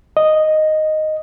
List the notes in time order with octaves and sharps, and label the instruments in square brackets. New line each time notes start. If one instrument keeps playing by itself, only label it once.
[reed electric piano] D#5